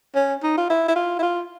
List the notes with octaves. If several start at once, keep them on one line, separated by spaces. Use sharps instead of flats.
C#4
D#4
F4
E4
E4
F4
E4
F4